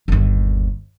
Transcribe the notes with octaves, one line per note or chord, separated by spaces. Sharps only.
G1 D#2